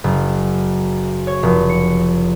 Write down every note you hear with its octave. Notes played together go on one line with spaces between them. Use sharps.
F#1
C#5
F1
C#7